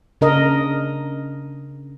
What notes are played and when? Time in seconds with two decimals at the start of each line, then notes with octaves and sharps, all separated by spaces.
0.21 C#3 D4 A#4 D#5